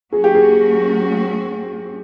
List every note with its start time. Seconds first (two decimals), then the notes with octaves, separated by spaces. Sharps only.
0.12 F#3 A#3 C#4 F#4 G#4
0.24 G4
0.35 G#4